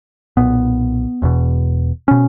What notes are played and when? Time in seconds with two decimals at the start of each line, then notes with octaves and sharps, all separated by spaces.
0.37 B1 A#2 B3
1.22 E1 E2 B2
2.08 B2 C#4